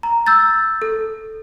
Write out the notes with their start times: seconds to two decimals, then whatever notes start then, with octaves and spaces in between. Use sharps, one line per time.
0.03 A#5
0.26 E6 G6 A6
0.82 A4